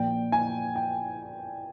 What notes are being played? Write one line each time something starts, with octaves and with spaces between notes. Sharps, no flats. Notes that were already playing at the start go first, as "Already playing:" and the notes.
Already playing: A#1 A#2 G5
G#5
G5